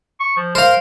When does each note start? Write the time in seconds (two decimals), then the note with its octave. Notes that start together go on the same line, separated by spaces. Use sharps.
0.20 C#6
0.37 F3
0.55 A#4 C5 F5